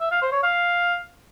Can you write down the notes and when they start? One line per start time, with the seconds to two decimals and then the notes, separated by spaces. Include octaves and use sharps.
0.01 E5
0.11 F5
0.22 C5
0.32 C#5
0.43 F5